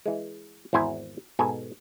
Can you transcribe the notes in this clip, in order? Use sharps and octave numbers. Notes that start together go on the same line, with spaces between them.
E3 G#3
G#1 E2 E4 C5 G#5 A#5
G#2 B2 A4 G#5